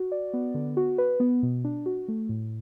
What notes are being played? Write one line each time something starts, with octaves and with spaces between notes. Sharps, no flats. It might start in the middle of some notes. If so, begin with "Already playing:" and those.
Already playing: F#4
D5
B3
D3
F#4
B4
B3
B2
D4
F#4
A3
A2